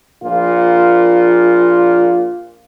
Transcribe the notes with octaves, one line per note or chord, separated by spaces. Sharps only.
A#1 A#2 F4